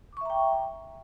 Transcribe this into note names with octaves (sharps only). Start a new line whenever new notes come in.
E5 G5 A#5 C#6 D6